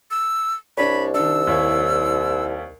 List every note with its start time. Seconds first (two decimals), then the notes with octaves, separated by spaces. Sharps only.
0.11 E6
0.77 C2 D4 C#5 B5
1.14 D#3 D4 E6
1.47 D#2 E4 C#5